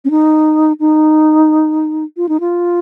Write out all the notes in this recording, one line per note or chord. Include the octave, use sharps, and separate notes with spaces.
C#4
D#4
D#4
F4
D#4
F4